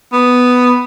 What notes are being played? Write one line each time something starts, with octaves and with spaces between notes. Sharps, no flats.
B3